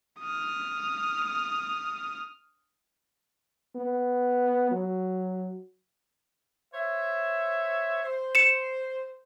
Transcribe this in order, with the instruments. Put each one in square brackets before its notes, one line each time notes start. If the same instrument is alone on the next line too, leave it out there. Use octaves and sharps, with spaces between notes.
[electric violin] D#6 F6
[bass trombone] B3
F#3
[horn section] C5 C#5 E5
C5
[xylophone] C#7 E7